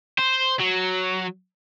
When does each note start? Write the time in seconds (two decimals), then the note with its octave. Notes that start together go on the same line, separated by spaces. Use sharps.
0.18 C5
0.60 F#3